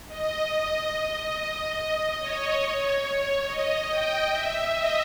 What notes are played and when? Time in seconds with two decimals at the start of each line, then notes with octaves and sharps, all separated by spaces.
0.08 D#5
0.92 D#5
1.77 D#5
2.19 C#5
3.45 D#5
3.88 G5
4.30 E5
4.72 D#5